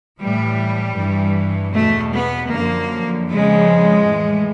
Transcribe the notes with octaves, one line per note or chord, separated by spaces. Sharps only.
A2 E3 G3
G2 E3
E2 B2 A3
B3
F#2 D3 F3 A#3
F2 C#3 F3 G#3
A2 E3